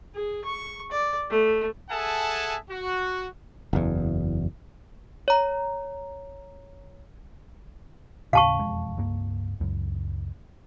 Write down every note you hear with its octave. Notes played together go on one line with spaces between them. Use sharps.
G#4
C#6
D5
A3
G#4 A4 E5 F#5 G#5 A5
F#4
F#1 E2
C#5 A#5
D#2 A2 C#3 F5 A5 C#6
E1 F2 G#3
C#2 G2 A#3
C#2 F#2